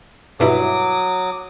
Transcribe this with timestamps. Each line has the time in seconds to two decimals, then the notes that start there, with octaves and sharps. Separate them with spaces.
0.40 G2 B2 F#3 E4 D6 D#6